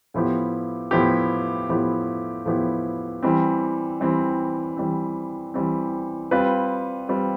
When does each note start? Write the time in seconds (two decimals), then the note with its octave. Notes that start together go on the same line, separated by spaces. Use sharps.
0.14 A2 F3 B3 E4 G4
0.91 A2 F3 B3 E4 G4
1.69 A2 F3 B3 E4 G4
2.46 A2 F3 B3 E4 G4
3.23 E3 G3 C4
4.01 E3 G3 C4
4.77 E3 G3 C4
5.54 E3 G3 C4
6.31 G3 C4 F4 B4
7.09 G3 C4 F4 B4